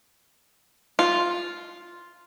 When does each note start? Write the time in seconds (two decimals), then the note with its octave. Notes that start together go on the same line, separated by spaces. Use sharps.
0.99 F4